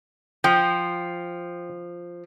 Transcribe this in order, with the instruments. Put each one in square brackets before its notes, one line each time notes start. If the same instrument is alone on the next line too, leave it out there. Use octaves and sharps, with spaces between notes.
[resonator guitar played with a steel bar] F3 [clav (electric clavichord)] G5